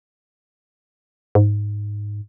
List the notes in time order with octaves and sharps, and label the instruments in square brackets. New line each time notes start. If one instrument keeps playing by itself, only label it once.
[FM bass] G#2